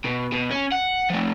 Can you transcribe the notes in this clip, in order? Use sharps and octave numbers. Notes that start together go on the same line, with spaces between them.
B2
B2
C#4
F#5
F3 A3